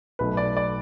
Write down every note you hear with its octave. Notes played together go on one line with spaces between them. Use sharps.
B1 B2 A3 B4
D5
D5